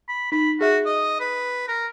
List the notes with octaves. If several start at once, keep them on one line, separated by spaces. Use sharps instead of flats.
B5
D#4 B5
F#4 G#4 E5
D#5
B4
A#4